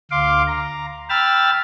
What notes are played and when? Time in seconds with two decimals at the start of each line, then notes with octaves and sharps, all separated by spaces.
0.11 D2 F5 C6 D6
0.47 A#5
1.10 G5 B5 E6 F6 A6